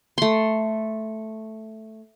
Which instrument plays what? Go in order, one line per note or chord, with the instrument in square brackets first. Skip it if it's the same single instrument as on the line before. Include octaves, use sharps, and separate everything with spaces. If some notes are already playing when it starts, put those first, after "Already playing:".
[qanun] A3 C6